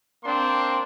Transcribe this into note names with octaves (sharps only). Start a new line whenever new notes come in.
A#3 C4 D4 C6